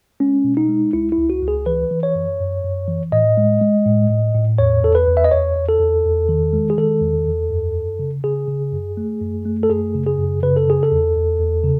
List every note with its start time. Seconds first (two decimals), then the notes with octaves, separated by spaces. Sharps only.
0.20 G#3 C#4
0.44 B2
0.57 D#4
0.69 G#3
0.93 C#2 E4
1.12 E4
1.18 C#2
1.30 F#4
1.43 C#2
1.48 G#4
1.66 E3 B4
1.91 E3
2.03 C#5
2.15 F#2
2.40 F#2
2.64 F#2
2.88 E3
3.12 A2 D#5
3.37 G#3
3.61 G#3
3.85 A2
4.10 A2
4.34 A2
4.58 E2 C#5
4.83 E2 A4
4.95 B4
5.07 E2
5.17 E5
5.25 D#5
5.32 E2 C#5
5.56 E2
5.69 A4
5.80 E2
6.05 E2
6.29 D#3
6.53 G#3
6.70 G#4
6.78 D#3 A4
7.02 E2
7.27 E2
7.50 F#2
7.75 F#2
7.99 C#3
8.24 C#3 G#4
8.48 C#3
8.73 F#2
8.97 A3
9.21 F#2
9.45 A3
9.63 A4
9.69 F#2 G#4
9.94 C#3
10.06 G#4
10.19 F#2
10.43 C#3 B4
10.56 A4
10.67 C#3 G#4
10.83 A4
10.92 E2
11.16 E2
11.40 E2
11.64 C#3